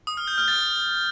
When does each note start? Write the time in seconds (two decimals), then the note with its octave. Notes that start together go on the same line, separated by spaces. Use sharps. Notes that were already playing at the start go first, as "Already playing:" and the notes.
0.07 D#6
0.17 F6
0.27 G6
0.38 F6
0.48 A6